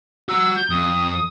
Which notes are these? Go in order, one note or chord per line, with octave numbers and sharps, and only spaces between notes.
F#4 A#5 E6
G6
F2 D#6